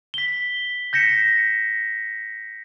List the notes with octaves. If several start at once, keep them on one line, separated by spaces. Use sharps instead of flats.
B6 G7
G6 A#6 B6 C#7 E7